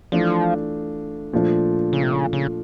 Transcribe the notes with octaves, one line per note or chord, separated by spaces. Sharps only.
E3 F3 A3 D4 F4
A#2 F3 A3 D4 F4
C#3
C3
C#3
C#3